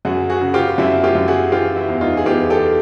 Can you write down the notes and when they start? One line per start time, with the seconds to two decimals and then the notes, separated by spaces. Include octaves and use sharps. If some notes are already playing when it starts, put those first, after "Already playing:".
0.05 F#2 F#4 G#4
0.29 F#4 G#4
0.41 C#3
0.54 F4 G4
0.78 F#2 E4 F#4
1.04 F4 G4
1.15 F#2
1.28 F#4 G#4
1.52 E3 F4 G4
1.76 E4 F#4
1.89 E2
2.01 D#4 F4
2.17 G#4
2.26 E2 F4 G4
2.50 G4 A4